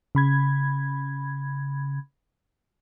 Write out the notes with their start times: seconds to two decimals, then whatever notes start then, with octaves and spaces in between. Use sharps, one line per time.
0.15 C#3 B5 G#6